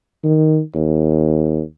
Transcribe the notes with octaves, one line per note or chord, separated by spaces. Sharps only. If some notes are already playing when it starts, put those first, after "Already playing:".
D#3
D#2